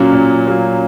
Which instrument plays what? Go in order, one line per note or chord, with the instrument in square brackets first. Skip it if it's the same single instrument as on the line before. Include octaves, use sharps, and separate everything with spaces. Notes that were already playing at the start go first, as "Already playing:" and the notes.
Already playing: [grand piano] A#2 F#3 A#3 [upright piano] C#4
[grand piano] A#2
F#3 A#3